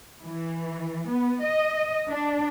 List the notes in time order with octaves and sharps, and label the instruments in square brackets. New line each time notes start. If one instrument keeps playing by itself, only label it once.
[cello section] E3
B3
D#5
D4